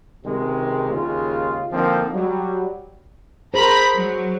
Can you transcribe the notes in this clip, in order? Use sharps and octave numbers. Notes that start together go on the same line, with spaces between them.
C#2 C3 D#3 G#3
D#2 C#3 G#3 F4
D3 F3 A#3 C4 D#4
F#3 G3
G#4 A#4 C5 B5 B6
F#3